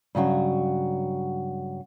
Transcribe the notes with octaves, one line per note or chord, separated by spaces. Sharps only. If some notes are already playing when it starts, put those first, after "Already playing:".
G2 C#3 F#3 F#4